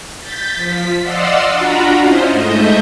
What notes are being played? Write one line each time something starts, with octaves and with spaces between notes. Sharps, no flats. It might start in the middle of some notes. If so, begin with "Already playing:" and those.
G6 A6 B6
F3 B6
D5 D#5 F5 F#5 C6 E6
D4 F4 F#4 F#5 A#5 B5
C#4 E4 F4 C5 D#5
G#2 A3 D#5 E5 G6